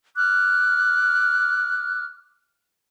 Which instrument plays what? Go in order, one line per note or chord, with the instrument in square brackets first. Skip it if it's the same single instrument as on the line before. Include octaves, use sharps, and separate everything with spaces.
[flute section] D6 F6 F#6